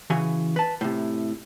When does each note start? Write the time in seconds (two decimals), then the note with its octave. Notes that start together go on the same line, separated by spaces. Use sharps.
0.10 C#3 E3 F#4 G#5
0.56 B4 A5
0.81 A2 C3